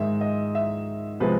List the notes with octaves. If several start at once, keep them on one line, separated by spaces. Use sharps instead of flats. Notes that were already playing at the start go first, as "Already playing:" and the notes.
Already playing: G#2 D#3 G#3 E5
D#5
E5
C3 F3 G#3 B4